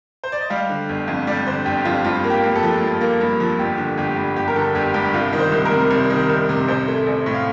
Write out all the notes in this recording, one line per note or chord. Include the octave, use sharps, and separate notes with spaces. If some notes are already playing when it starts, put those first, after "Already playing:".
C5
D5
D#5
G3 F5
D3
G1
F2
G3 D5
D3 C5
G1 G4
F2 F4
G2 F4
A#3
G4
G2
A4
F3
G2
A#3
G2
F3
G1 G4
D3
G1 G4
G2
G1 G4
A#4
D3 A4
G1 G4
G2 G4
C2 F4
D#3
C5
C2
A#4
C3
C2
D#3
C2
C3
A1 C5
A3
A1
A2
F5